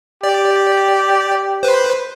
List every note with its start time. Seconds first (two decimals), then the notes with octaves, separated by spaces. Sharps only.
0.24 G4 D5
1.63 B4 C5